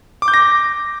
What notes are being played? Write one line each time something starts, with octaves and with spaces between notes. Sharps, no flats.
D6
G6
A#6